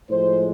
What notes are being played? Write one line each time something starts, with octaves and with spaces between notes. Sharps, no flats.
A2 F3 G#3 C5